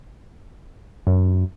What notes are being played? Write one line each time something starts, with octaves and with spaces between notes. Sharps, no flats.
F#2